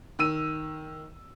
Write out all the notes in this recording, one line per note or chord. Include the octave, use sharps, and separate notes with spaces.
D#3 E6 D#7